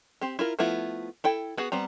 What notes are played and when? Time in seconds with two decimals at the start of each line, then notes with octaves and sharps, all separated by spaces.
0.21 C4 G4
0.39 E4 F4 A#4
0.59 F3 A3 B3 E4 F4
1.24 E4 A4 G5
1.57 B3 F#4 G#4
1.72 G3 B3 C4 A#5